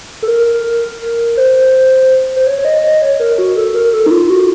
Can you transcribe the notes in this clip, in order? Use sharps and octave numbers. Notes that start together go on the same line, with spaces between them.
A4
A#4
C5
C5
C#5
C#5
D#5
D#5
C#5
A#4
F#4
A4
A#4
A4
D#4
F4
F#4